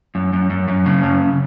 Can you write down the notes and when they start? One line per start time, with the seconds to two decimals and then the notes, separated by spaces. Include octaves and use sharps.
0.15 F#2
0.33 F#2
0.50 F#2
0.68 F#2
0.86 C#3
1.03 F#2